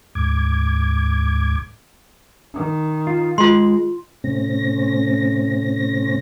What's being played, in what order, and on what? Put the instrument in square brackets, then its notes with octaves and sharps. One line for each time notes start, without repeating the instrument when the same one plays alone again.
[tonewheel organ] D2 G#2 D6 G#6
[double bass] D#3
[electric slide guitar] F4
[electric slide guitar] G#3 [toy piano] F4 C6
[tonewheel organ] A2 C3 A3 C4 C#4 A#6